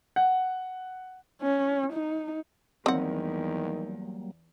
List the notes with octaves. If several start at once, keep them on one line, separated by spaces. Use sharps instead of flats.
F#5
C#4
D#4
E2 D#3 F#3 G3 A#3 C4 F#5